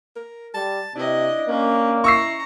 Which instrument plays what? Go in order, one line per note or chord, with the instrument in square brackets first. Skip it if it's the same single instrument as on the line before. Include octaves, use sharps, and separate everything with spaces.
[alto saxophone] A#4
[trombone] G3 [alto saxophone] A5
[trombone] C3 [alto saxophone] D4 [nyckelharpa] E4 D#5
[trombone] A#3 [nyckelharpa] C#4
[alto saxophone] E4 [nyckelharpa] A#5 [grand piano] C#6 E6 C7